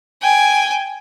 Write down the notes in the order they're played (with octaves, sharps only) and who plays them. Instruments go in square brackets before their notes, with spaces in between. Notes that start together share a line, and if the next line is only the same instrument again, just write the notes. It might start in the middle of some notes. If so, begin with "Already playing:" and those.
[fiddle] G5 G#5